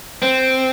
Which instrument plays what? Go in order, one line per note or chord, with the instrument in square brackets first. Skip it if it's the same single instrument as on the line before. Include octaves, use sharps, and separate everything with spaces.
[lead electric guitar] C4